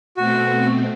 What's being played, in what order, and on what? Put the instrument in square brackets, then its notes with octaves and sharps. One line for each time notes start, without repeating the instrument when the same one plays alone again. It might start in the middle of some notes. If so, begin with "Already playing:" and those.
[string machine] B2 A3 C4 [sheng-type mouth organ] F#4